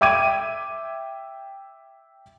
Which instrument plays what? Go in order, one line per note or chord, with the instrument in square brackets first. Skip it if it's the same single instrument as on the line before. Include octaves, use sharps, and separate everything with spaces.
[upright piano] E5 G5 D6 G#6 D#7